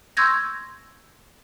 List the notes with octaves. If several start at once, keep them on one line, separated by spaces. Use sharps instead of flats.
C6 C#6 E6 G6 G#6 A#6